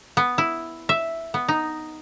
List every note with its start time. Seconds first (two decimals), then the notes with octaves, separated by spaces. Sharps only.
0.17 B3
0.38 E4
0.89 E5
1.34 B3
1.48 D#4